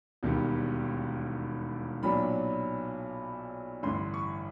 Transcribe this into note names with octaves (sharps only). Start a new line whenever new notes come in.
E1 D#2 D#3 G3 B3
B1 A#2 F#3 B3 D4 B5
A1 G2 D3 C6
C#6